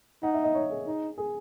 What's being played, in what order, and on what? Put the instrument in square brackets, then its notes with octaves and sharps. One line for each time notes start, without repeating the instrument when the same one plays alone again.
[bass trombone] D#4 [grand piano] F#5
[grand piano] E5
D#5
C#5
G#4
[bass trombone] D#4
[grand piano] G#4